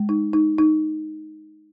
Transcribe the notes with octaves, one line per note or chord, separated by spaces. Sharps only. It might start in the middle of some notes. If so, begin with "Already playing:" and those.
Already playing: G#3
D#4
D#4
D#4